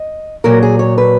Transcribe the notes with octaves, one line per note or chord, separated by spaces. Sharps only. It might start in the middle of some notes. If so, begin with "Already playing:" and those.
Already playing: D#5
A#2 F#3 A#4
G#4
C#5
B4